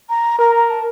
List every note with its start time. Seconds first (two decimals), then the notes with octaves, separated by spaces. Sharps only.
0.09 A#5
0.39 A#4 A#5
0.55 A#5
0.70 A5